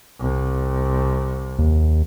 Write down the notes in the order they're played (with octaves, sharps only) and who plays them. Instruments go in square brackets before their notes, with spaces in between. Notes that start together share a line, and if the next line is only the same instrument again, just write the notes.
[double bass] C2
[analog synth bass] D#2